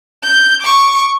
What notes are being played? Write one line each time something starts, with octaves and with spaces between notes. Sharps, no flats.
G6
C#6 D6